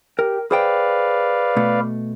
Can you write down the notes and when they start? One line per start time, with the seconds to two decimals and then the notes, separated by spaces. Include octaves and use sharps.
0.19 G4 A#4
0.51 G#4 B4 C5 D5 F5 G5
1.57 B2 A3